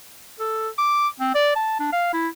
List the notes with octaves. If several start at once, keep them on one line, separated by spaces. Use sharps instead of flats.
A4
D6
C4
D5
A5
D4
F5
E4